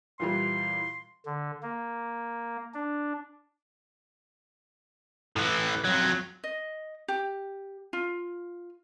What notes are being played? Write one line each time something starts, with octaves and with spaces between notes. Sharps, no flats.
A#2 E3 G3 C6
D3
A#3
D4
A2 E3
F2 F#3
D#5
G4
F4